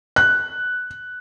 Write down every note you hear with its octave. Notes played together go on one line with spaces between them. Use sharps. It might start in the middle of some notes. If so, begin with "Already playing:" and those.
F#6